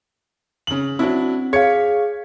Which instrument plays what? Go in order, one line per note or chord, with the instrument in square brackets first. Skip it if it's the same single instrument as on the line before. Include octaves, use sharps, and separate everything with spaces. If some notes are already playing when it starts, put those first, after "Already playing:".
[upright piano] C#3 F#7
[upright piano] F#3 D4 E4 [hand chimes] C4
[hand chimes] G#4 F5 [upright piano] C#5 G#6 C#7